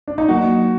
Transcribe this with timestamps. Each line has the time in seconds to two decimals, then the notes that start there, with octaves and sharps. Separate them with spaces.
0.08 D4
0.18 D#4
0.28 F#3 A#3 F#4